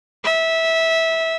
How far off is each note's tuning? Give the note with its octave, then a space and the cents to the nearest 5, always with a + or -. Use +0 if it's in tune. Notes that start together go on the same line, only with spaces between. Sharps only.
E5 -15